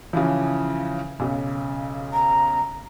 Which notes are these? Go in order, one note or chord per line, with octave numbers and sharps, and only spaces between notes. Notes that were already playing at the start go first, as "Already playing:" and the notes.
C#3 E3 F3
B1 C#3
A#5